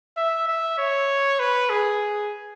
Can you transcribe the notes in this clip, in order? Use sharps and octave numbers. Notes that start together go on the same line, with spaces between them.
E5
E5
C#5
B4
G#4